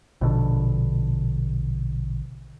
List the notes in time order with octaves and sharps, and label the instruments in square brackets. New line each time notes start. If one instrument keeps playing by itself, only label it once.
[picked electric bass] A#1 B2 D3